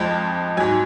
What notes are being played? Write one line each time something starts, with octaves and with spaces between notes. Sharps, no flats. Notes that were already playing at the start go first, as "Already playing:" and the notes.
Already playing: F2 F3 G#3
G#2 F#3 G#5